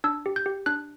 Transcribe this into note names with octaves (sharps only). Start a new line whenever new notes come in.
D4 E6
G4
G6
G4
D4 F#6